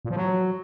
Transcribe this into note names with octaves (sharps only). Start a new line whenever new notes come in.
A#2
F3
F#3